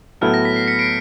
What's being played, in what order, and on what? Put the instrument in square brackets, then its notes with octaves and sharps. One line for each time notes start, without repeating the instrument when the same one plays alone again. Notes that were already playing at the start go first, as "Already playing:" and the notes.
[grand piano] A2 F#3 B3 E4 A4 [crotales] F6
[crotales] A#6
B6
C7
B6 C#7
C7 D7